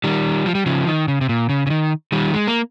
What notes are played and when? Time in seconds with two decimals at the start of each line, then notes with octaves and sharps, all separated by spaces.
0.04 D#3 G3
0.46 F3
0.55 G3
0.66 C#3 F3
0.87 D#3
1.08 C#3
1.21 C3
1.29 A#2
1.49 C#3
1.67 C#3
1.70 D#3
2.12 D#3 G3
2.34 G#3
2.47 A#3